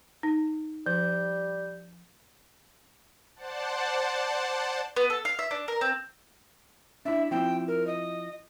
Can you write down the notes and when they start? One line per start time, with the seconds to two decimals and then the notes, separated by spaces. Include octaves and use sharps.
0.23 D#4
0.86 F3 G3 G6
3.36 C5 D5 F#5 A5
4.96 B3
5.10 A4
5.25 F5
5.39 E5
5.51 D4
5.68 A#4
5.81 C4
7.05 D4 E4 E5
7.31 F3 C4 E4 G5
7.68 A#4
7.87 D#5